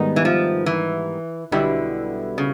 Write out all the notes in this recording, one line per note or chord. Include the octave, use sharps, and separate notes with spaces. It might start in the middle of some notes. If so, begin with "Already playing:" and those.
Already playing: G#2 D#3 G3 B3 D#4
E3
F3
E3
B1 B2 D3 G3 B3 E4
C#3